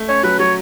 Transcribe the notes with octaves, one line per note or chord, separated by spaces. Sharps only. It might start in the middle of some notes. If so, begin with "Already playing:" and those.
Already playing: A3
C#4 C#5
F#3 B4
F#3 C#5